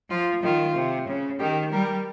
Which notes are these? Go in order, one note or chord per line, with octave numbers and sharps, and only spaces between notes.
F3 F4
D#3 F4
C3
C#3
D#3 G4
G3 A#4